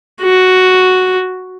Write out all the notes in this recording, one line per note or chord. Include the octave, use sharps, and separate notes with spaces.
F#4